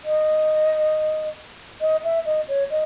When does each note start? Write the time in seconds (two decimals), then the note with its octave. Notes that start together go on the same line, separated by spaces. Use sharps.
0.05 D#5
1.81 D#5
2.04 E5
2.26 D#5
2.49 C#5
2.70 D#5